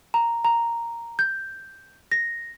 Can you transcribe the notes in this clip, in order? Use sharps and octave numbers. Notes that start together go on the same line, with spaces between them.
A#5
A#5
G6
A#6